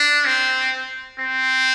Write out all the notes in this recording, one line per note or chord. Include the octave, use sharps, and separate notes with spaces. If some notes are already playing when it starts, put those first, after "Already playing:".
Already playing: D4
C4
C4